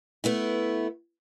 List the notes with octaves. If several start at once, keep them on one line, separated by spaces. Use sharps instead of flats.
A3 B3 E4